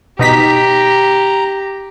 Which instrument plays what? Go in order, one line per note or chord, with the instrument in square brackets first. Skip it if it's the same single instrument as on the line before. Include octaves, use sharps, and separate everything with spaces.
[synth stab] B2 D#4 B6 [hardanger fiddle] G4 [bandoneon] A#5